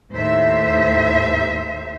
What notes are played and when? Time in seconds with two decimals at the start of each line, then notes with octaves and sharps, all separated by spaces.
0.11 D#2 A2 C5 E5